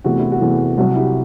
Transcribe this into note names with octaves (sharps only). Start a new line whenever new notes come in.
E2 C3 E3 A3 F#4
E4
F#4
E2 C3 E3 A3
C2 C3 F#3 F#4
E4 G4